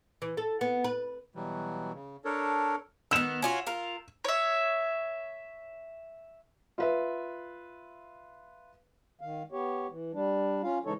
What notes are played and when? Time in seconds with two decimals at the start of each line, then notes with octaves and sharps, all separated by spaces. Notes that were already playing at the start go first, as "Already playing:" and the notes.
0.22 E3
0.37 A4
0.61 B3
0.84 B4
1.35 B2 E3 F#3 G3
1.94 C#3
2.25 D4 A4 A#4 C#5
3.11 D#3 B3 E6 E7
3.42 C#4 F4 F#4
3.67 F4 A#4
4.25 C#5 E5
6.78 F4 B4 E5
9.21 D#3 F5
9.52 B3 G4 C#5
9.90 E3
10.13 G3 D4
10.63 C#4 F4 F5
10.85 C#3 E3 G#3 D#4 A4 C#5